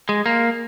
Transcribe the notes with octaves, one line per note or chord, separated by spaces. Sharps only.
G#3
A#3